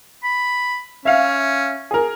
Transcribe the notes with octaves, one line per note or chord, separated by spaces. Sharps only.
B5
C#4 E5 F5
G#4 A#4